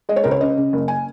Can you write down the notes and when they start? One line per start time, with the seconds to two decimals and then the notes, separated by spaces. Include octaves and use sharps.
0.09 G#3 D#5
0.16 C#5
0.24 C#2 A#4
0.31 C#5
0.41 C#3 D#5
0.57 C#3
0.73 F#1
0.88 G#5